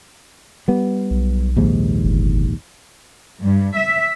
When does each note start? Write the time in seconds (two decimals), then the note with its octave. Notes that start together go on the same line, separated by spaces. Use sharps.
0.68 G3 B3
1.11 B1
1.57 A#1 D#2 G#2
2.05 G1
3.43 G2
3.78 E5